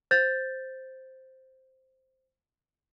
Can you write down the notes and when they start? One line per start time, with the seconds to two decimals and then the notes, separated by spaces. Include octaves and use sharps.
0.11 C5 G6 A6